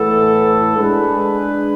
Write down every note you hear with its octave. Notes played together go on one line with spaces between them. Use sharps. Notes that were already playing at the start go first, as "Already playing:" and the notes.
Already playing: A2 E3 B3 E4 A4
G#3 D4 G#4 B4